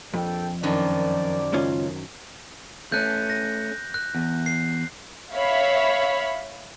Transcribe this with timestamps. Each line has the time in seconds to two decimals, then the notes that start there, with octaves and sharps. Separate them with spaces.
0.14 A#1 F2 A4 G5
0.63 F#2 D#3 F3 D5
1.53 C#2 C#4 F4
2.92 A3 C#4 F#6 G6
3.30 A#6
3.94 F#6
4.15 E2
4.46 C7
5.35 C#5 E5 F5 B5